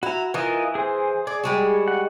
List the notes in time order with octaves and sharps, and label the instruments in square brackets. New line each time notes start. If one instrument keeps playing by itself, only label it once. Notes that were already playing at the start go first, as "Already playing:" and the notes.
[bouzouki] E4 [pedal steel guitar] F#4 A#5
[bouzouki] E3 [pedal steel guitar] F4 A#4 D#5
[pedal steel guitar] G#4 C5
[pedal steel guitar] G#4 [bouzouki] D5
[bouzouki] G3 G#3 F#4
[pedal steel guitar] F#5